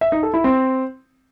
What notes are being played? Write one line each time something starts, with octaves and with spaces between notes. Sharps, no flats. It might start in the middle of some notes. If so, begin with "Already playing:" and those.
E5
D#4
A4
E4
C4